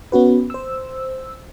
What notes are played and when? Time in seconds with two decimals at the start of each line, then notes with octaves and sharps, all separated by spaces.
0.12 B3 C#4 F#4 B4
0.50 C5 E6